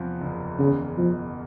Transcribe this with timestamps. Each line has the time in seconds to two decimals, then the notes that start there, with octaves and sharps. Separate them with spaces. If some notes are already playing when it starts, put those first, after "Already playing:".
Already playing: E2 C3 F3
0.21 F#1
0.59 E2 C#3
0.98 B2 F3